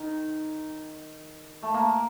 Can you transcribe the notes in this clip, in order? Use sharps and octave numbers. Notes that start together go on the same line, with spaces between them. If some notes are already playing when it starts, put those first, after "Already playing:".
Already playing: D#3
A3
A#3